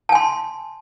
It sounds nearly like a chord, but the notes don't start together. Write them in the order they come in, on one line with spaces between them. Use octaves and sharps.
A5 G#5 C6